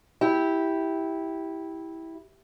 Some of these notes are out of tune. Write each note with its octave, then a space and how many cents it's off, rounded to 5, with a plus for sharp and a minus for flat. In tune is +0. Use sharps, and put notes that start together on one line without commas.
E4 -10 G4 +0